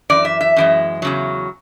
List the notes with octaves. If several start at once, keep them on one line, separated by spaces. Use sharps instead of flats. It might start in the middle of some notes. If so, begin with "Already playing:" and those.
F#2 E3 D5
E5
E5
F#2 E3 G#3
E2 C#3 F#3